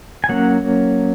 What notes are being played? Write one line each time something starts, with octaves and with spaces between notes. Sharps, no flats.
G#5
F#3 A#3 C#4 F#5